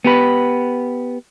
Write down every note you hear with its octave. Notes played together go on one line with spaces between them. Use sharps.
B3 G4 B4